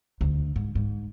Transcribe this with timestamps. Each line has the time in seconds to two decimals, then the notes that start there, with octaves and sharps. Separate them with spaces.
0.21 D2
0.56 G#2
0.75 G#2